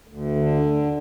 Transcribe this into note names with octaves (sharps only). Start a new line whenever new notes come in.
D2
D3